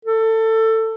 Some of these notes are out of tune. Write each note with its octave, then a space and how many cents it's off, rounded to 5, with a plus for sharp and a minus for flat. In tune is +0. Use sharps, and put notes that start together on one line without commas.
A4 +20